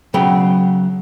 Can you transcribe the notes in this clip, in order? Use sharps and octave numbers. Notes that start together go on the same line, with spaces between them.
C#3 F#3 B3 G5